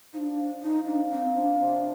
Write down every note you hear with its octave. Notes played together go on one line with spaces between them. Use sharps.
F3 D4 D#4
F3
F3 D#4
A#3 D4
A#3 C4
F3 D4
C3